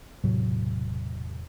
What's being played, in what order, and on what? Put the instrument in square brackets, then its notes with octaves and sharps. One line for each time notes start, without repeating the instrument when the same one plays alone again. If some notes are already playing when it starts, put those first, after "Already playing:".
[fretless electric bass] E1 A2 C3 F#3